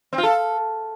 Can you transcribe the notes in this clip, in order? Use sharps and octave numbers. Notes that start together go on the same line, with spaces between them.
C4
F4
A4